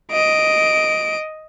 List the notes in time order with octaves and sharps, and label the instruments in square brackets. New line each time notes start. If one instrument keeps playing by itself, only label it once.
[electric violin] D#5 D7